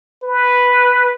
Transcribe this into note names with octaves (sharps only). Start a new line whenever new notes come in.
B4